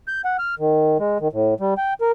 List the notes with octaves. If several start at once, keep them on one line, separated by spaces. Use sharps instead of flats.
G6
F#5
F6
D#3
G#3
D#3
A2
G3
G5
A#4